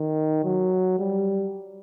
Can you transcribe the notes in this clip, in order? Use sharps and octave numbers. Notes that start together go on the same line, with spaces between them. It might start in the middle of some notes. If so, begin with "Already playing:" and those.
Already playing: D#3
F#3
G3